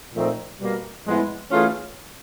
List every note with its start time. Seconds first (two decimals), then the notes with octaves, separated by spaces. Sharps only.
0.14 A#2 F3 A3 C4 D#4
0.59 B2 G3 A#3
1.05 A2 F3 G#3 B3 E4
1.51 E3 A3 C#4 F4 G#4